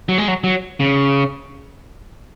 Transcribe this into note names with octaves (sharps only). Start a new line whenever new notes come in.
F#3
G#3
F#3
F#3
C#3